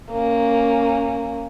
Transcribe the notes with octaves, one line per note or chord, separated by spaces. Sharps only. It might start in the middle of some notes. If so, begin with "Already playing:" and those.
A#3 C#4